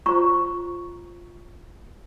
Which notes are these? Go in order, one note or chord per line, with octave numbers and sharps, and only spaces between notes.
F4 C5 A#5 C#6